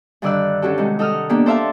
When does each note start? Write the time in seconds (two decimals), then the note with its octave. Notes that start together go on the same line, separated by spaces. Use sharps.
0.22 G2 D3 D#3 D5 E6 F#6
0.62 C#4 D4 F#4 G4 A4
0.78 C3 D#3 G#3
0.99 D#4 A4 F#5 D#6 F6
1.29 A#3 B3 D4 G4
1.46 A4 C5 D5 E5 F5 A5